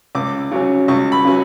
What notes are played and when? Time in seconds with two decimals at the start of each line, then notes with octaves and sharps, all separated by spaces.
0.15 C#2 D6
0.51 C#3 F#3 C#4
0.88 C#2 C#6
1.12 B5
1.25 C#3 F#3 C#4